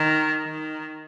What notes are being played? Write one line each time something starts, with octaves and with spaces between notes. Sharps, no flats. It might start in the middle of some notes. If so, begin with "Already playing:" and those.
Already playing: D#3
D#3